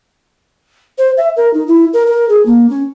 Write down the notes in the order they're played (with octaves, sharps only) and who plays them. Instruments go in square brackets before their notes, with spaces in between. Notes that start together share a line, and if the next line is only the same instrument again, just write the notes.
[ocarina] C5
E5
A#4
D#4
E4
A#4
A#4
G#4
A#3
C#4